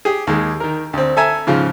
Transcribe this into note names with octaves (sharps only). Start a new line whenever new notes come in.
G4 G#4
D#2 G#3
D#3 A#4
D2 C4
A4 E5 G#5 A#5
G#2 C#3 F3